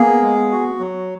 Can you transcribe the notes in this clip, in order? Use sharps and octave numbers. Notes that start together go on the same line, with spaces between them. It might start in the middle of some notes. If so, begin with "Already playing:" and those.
Already playing: A#3 B3 G#4
G#3
F#4
F#3